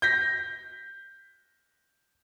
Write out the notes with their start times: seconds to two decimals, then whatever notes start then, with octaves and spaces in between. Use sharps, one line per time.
0.02 G6 A#6 B6